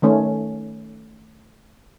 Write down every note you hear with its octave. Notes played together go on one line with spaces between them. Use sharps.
D#3 A3 C#4